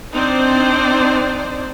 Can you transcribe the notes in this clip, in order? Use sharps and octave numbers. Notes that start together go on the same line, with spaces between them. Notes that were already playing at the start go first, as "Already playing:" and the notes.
C4 D4 D#4 C5 D5